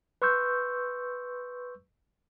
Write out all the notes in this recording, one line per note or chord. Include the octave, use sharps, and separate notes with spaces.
B4 C6 C#6 E6 G6